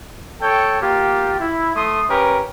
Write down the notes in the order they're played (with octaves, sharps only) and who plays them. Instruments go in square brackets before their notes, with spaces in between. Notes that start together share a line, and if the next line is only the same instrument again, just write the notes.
[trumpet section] A4 C#5 G5
A#3 F4 G4
E4
A3 C6 D#6
C#4 G4 A#4 B4